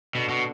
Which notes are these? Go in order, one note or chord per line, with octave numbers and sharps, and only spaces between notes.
B2 D3
B2